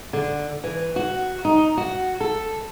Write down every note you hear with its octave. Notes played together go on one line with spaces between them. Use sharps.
D3
E3
F#4
D#4
F#4
A4